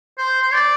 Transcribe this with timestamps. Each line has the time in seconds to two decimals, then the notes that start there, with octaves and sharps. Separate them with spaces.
0.18 C5
0.42 C5
0.54 D5